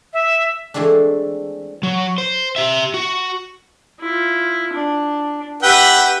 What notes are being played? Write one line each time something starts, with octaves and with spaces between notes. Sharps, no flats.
E5
E3 G#3 A3 C4 D4
F#3
C5
G4 E5
F#4
E4 F4
D4
G4 B4 E5 F#5 G5